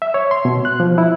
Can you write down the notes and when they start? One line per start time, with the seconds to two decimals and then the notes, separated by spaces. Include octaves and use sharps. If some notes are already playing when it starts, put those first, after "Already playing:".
0.02 E5
0.14 C#5
0.31 C6
0.45 B2
0.65 F#6
0.80 F3
0.98 E4